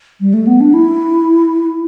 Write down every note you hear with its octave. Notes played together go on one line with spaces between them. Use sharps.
G3
A3
B3
D4
E4